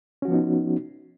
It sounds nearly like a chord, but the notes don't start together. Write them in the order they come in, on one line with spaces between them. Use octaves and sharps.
C#4 F#4 F3 B3 D#4